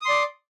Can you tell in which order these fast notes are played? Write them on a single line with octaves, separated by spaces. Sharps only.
D#6 C6 D5